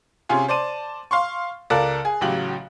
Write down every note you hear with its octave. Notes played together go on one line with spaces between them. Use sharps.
C3 C#4 F4 G#4
C5 D5 A5 D#7
F5 C6 C#6
C#2 A4 A#4 D5 A5 F#6
G#4
A1 C#3 F#3 G4 F#7